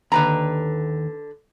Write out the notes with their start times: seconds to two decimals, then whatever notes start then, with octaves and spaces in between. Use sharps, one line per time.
0.12 D#2 D3 B4 A#5 B5